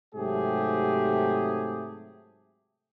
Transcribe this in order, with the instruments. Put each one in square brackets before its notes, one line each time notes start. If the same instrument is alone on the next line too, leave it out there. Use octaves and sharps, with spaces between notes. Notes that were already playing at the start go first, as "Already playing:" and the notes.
[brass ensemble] G#2 C3 F#3 A3 G4 G#4